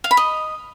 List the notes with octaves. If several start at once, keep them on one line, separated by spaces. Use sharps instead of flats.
F5
B5
D#5